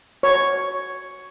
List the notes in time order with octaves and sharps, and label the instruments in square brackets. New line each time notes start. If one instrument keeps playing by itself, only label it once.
[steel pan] C#5